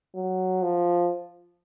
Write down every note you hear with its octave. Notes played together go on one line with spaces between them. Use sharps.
F#3
F3